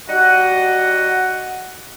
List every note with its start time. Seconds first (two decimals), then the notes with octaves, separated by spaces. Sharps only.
0.09 G3 D#4 F#4 D#5 F#5